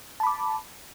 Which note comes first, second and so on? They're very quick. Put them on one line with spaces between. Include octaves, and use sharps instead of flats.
A5 B5 D6